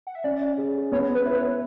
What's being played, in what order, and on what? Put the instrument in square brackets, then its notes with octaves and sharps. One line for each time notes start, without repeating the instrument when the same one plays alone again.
[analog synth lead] F#5
E5
[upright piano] C#4 [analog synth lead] D5
[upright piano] G#4
[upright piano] B3 [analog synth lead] C#5
[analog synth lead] B4
[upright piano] E4 [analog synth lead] B4
[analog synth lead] C#5